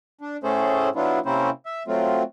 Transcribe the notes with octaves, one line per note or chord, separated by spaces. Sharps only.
D4
A2 A3 C#4 G#4 A4 C5
F#3 B3 D4 E4 F4
C3 A#3 C4 C#4 E4 C5
E5
F#3 A3 C4 F4